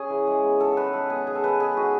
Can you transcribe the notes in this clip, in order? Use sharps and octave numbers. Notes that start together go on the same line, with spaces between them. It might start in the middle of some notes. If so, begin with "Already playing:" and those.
Already playing: C#4 G#4
E3
G#3
B3
D#3 A4
D#3 B4
G#3 A4
B3 G#4
D#3 G#4
A4
D#3 B4
G#3 G#4
D#4 F#4